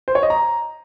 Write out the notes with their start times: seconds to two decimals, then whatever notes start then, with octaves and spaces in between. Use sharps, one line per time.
0.08 C5
0.15 C#5
0.23 D#5
0.30 A#5